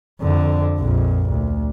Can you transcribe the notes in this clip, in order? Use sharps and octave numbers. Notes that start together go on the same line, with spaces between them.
F2 D3
A#1 F2
D2